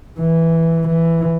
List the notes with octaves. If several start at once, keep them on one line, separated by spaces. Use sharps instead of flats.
E3
E3